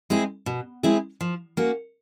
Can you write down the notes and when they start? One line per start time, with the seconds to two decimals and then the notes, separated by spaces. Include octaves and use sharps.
0.10 G#3 C4 E4 G#4
0.46 B2
0.83 G#3 C4 E4 G#4
1.21 F3
1.57 A#3 C#4 F#4